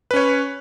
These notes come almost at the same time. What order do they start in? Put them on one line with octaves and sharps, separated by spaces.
B4 C#4 C#5